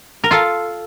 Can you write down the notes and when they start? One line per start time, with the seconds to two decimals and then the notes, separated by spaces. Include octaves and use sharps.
0.24 A#4
0.31 F4 A4